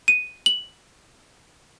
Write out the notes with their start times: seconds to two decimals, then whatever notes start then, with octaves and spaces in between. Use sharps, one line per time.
0.08 D#7
0.46 F#7